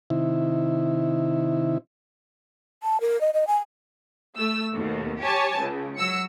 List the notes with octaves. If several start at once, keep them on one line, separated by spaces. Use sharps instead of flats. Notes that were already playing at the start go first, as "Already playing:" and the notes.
C3 D#3 E4
A5
A#4
D#5
D#5
G#5
A3 E6
D#2 B2 A3
G4 C#5 G#5 A5
C#2 C#3
F#3 E6 C#7